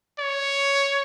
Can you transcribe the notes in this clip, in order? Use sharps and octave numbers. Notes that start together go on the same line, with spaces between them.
C#5